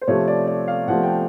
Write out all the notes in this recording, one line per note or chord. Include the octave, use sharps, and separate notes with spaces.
C5
C3 F3 A3 C#5
D5
D5
F5
C3 F3 A3 F#5
G5